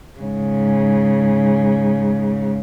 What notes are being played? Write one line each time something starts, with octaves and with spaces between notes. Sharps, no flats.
G#2 C#3